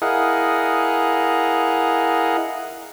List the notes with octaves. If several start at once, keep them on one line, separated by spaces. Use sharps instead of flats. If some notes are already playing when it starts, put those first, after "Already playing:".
E4 G#4 A#4 D#5 F5 F#5